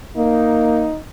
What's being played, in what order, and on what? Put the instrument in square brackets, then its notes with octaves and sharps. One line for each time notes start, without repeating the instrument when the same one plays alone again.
[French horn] A#3 [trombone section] D#4